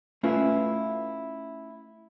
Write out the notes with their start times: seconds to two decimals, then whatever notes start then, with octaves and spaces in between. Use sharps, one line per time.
0.23 A3 C#4 E4 F4 B4 F5